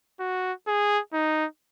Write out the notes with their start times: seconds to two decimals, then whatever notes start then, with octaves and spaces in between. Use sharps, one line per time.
0.20 F#4
0.68 G#4
1.14 D#4